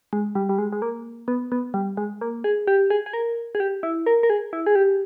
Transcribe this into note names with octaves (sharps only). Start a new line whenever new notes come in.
G#3
G3
G3
G#3
G#3
A#3
B3
B3
G3
G#3
A#3
G#4
G4
G#4
G#4
A#4
G#4
G4
E4
A#4
A#4
G#4
E4
G#4
G4